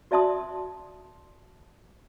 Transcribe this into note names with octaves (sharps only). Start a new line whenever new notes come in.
F#4 D5 E5 A5 C6 D#6